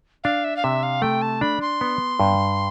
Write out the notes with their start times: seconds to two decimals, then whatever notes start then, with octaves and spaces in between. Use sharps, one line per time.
0.24 D4 F5
0.44 E5
0.57 F5
0.64 C3 E5
0.83 F5
1.02 A3 G5
1.22 A5
1.41 D4 B5
1.61 C6
1.81 B3
2.20 G2